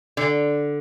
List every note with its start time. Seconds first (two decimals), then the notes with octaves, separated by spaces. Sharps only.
0.17 D3